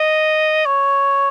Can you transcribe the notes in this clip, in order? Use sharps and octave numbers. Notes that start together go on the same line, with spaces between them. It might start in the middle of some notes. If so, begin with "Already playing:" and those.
Already playing: D#5
C#5